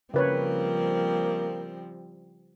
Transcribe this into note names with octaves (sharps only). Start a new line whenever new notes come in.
C#3 F3 G3 A#3 C4 B4 C#5